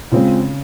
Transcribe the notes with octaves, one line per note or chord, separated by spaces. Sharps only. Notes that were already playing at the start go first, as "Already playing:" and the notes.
C#3 G#3 C4 F4